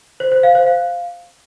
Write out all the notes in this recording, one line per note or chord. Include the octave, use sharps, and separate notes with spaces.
C5
C5
F5
C5
F5